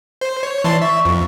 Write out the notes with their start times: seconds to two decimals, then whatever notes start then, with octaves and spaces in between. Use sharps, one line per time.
0.21 C5
0.43 C#5
0.64 E3 D5 A5 C6
0.82 E5 C#6
1.05 F2